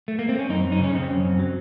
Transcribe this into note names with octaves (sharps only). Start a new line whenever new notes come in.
A3
A#3
C4
C#4
F#2 D#4
F#2
D#4
C#3 C#4
C#3 C4
F#2
F#2
F#3